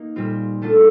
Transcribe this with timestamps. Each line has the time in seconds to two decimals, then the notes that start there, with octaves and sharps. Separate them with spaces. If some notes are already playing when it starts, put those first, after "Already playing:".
Already playing: A#3 D#4
0.16 A#2 G3 C4 F4
0.62 A3 D4 F4 A4